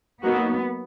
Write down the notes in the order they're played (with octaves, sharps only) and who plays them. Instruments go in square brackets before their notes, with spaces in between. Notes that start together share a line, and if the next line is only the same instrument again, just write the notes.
[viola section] F#3 A#3 D#4 F#4 [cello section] B3